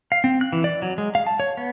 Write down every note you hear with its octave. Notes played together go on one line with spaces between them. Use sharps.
F5
C4
F#6
E3
D5
F#3
G#3
F5
A5
C#5
B3